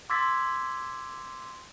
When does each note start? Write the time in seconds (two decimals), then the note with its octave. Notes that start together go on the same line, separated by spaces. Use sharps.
0.10 C6 D6 E6 G#6 A6 B6